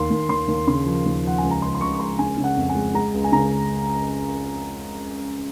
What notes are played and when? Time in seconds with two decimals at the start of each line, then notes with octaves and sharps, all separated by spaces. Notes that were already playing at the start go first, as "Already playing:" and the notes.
Already playing: D#2 C6
0.10 D#2
0.29 D#2 C6
0.48 D#2
0.67 C#3 C6
0.86 F3
1.06 D#2
1.24 F3 F#5
1.38 C#2 G#5
1.51 A#5
1.62 C#2 C6
1.75 C6
1.81 C#2 C#6
1.93 C#6
2.00 C#2 C6
2.19 C#3 G#5
2.37 C#3
2.44 F#5
2.57 F2
2.69 G#5
2.75 G#3
2.94 G#3 A#5
3.14 C#2
3.24 G#5
3.32 C#3 A#5